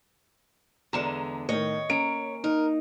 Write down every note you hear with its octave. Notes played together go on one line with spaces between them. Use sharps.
E2 D3 G#3 A#5 E7
A2 D#3 C#5 D#5
A#3 C#4 D7
D#4 A#4